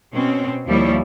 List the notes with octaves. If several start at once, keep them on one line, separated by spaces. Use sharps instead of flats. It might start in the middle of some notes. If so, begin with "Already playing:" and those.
B2 C4 C#4
D#2 F3 G3 E4 C#5